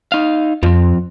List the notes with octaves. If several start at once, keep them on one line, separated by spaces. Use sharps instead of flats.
D#4 F5
F2 F3 C4